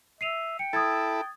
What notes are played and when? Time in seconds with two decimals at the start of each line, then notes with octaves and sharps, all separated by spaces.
0.21 E5 C7 D#7 F7
0.59 G5 C#7
0.73 E4 A4 D#6 G#6 A6